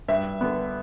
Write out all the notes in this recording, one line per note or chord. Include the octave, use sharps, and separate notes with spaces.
G2 E5
D3 B3